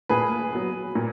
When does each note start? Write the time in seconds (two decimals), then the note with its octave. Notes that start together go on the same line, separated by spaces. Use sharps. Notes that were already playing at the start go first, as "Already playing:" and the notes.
0.09 A#2 G#4 B4
0.53 F#3 B3
0.95 A#2